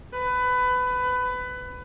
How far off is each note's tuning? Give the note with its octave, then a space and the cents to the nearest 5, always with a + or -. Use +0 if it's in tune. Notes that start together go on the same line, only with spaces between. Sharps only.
B4 +20